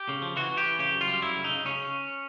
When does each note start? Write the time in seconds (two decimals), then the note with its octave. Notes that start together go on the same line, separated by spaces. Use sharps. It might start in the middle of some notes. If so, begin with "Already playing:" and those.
Already playing: G4
0.09 C#3
0.22 F3
0.36 E3 F#4
0.51 E3
0.57 G4
0.66 E3
0.79 C#3 G4
0.93 F#2
1.01 F4
1.08 G3
1.22 F#2 E4
1.36 C#3
1.44 D#4
1.51 C#3
1.65 C#3 C#4